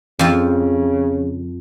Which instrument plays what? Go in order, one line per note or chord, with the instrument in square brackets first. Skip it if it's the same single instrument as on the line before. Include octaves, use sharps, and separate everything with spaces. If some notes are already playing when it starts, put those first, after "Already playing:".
[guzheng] F2 F3 [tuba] C#3